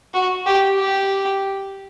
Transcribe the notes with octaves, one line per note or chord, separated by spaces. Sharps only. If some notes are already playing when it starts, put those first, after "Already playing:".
F#4
G4
G4